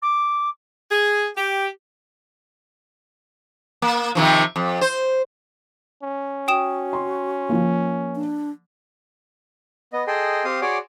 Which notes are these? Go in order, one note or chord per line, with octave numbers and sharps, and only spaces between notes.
D6
G#4
G4
A#3
C3 D#3 F3
F2
C5
C#4
F#4 G5 D#6 E7
C6
F3 A#3
D4
B3 D#5
G#4 A4 D#5 G5 C6
C4 G4 F5 C6 D#6
F#4 G#4 C#5 D5 C6 D6